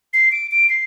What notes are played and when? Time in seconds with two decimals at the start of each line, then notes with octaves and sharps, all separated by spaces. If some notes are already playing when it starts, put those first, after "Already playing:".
0.13 C7
0.32 D7
0.51 D7
0.70 C7